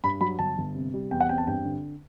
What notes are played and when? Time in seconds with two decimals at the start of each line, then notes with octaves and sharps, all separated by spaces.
0.04 G2 B5
0.21 F#3 B5
0.39 G1 A5
0.58 G1
0.75 C3
0.94 G3
1.11 E2 G5
1.21 F#5
1.29 C4 G5
1.38 A5
1.47 G2 G5
1.65 D3